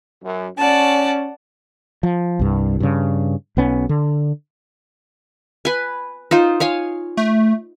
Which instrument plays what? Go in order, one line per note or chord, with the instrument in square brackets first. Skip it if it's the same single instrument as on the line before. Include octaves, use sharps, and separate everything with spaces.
[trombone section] F#2
[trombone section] C#4 [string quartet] D5 F#5 A5
[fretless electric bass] F3
C2 G2
G2 C#3
B1 B3 C#4
D3
[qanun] B4 G#5
D#4 F4 C5
C#5 F5 G#5
[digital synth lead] A3